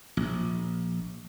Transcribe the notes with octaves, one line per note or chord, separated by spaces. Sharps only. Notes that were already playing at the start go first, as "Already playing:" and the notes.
A#1